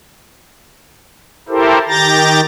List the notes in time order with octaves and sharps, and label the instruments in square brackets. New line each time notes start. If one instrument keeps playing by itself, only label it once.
[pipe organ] E4 G4 A4 A#4 C5
D#3 G4 A#5 G6 A6 A#6